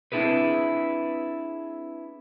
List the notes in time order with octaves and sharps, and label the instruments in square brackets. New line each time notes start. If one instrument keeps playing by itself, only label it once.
[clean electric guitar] C4 D4 E4 G#4 B4